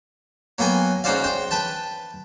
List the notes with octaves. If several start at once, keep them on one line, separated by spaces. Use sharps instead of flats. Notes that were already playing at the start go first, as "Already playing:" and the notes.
F#3 A#3 B3 G5 G#5
G#2 C#4 F#4 C5 D5 F5
C5 G5
B4 G5 A5